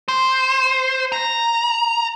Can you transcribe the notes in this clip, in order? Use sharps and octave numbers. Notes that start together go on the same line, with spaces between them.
C5
A#5